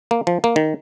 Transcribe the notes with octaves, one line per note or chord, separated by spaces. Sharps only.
A#3
F3
A#3
D#3